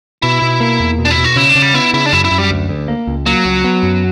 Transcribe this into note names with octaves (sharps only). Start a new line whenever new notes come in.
B2 E4
B2
A#3
E2
B2
D4
E4
B2
F#4
C#3 E4
D4
C#3
G3
B3 E4
C#3 E4
D4
F#2 E4
E4
F#2
G3
D2
D2
A#3
C#2
F#3 A#3
C#2
B3
F#2